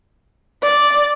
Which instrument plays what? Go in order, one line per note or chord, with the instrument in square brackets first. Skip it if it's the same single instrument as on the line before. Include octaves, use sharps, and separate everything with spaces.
[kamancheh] D5